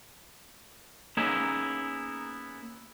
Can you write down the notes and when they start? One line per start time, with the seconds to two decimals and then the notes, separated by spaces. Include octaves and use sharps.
1.17 A#3 B3 C#4 D#4 E4 G#4